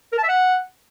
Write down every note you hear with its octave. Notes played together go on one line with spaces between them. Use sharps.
A#4
A5
E5
F#5